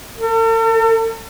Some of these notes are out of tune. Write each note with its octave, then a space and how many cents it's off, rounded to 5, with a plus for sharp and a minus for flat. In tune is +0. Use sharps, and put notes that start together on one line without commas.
A4 +45